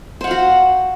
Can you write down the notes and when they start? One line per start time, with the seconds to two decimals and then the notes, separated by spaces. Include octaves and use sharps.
0.21 C5
0.24 F#5
0.27 F5
0.31 F#4